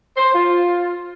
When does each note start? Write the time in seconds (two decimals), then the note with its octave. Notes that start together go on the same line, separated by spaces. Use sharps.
0.17 C5
0.35 F4